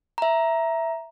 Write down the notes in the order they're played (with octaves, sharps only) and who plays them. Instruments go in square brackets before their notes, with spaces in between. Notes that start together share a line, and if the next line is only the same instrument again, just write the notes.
[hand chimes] E5 A#5